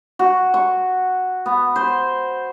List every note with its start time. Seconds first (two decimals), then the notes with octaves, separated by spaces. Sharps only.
0.19 F#4
0.54 C#6
1.46 B3
1.76 C5